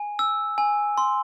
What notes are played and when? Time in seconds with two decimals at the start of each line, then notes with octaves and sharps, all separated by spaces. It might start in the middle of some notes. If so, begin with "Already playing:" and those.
Already playing: G#5
0.19 E6
0.58 G#5
0.98 C6